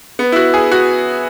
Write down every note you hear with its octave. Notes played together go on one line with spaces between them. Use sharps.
B3
E4
F#4
G#4
F#4